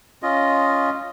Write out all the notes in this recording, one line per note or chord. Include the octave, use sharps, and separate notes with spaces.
C#4 F4 D#5